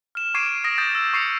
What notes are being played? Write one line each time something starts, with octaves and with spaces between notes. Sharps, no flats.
F6 E7
C#6 D6 G#6 C7 D7 D#7
D#6 A#6 D7
D#6 G6 A6
E6
C#6 C7 C#7 F7